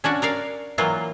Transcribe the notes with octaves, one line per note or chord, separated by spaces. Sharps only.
C#4 D4 F#4
A#4 D5 F5
E3 F#3 A#3 F4